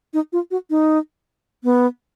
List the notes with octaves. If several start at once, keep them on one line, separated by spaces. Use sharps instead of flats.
D#4
F4
F#4
D#4
B3